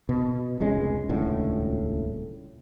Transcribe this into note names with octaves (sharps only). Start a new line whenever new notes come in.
B2
F1 C#2 G#3 C#4
D#1 C#2 A2 D3